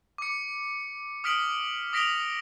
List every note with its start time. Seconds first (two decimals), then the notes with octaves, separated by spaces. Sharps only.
0.18 D6 C#7
1.24 D#6 F6 B6 D7 F#7
1.93 D#6 A#6 B6 D7 F7 G7